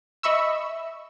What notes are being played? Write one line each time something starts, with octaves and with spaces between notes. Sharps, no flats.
D#5 E5 B5 C#6 E6